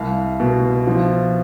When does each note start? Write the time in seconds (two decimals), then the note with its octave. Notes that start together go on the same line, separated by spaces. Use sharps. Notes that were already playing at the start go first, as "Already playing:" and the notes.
Already playing: C2 F5
0.40 B2
0.87 F3